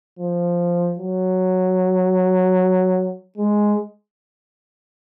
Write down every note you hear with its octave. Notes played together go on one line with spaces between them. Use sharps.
F3
F#3
G#3